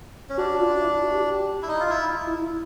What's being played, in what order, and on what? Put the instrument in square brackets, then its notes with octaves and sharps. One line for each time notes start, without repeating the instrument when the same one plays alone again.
[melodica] C#4
[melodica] D4 [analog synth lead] F#4
[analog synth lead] F4
E4
F#4
G4
[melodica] E4
D#4
F4
E4
[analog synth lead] E4
E4